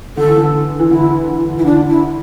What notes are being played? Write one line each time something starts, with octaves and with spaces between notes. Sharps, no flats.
D3 A4
E3
D3
E3
D3 E4
E3
E3 E4
D3 D4
E4